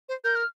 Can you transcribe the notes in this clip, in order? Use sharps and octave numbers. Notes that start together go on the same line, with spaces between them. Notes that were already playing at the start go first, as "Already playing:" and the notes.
C5
A#4 G6
F6